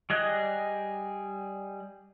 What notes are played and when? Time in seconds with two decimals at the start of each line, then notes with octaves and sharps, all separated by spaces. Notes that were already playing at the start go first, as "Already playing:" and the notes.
0.10 G3 G#4 D#5 F#6